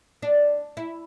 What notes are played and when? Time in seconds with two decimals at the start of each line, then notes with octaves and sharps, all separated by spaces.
0.22 D4
0.77 E4